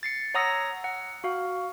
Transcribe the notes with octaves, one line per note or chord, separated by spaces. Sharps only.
A6 C7 C#7
C#5 F#5 A#5 D#6 E6 A#6
F#5
F#4 F5